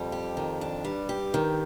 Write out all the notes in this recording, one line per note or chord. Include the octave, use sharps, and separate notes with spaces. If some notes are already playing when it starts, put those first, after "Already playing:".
Already playing: F2 G3
G4
D#3
D4
G2 G3
G4
D#3